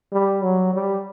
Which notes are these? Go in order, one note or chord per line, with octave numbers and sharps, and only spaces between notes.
G3
F#3
G3